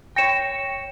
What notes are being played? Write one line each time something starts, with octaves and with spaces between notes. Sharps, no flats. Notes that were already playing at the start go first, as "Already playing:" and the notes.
C#5 G5 A#6 C#7 E7